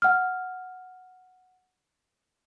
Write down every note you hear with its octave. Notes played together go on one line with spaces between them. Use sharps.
F#5 F6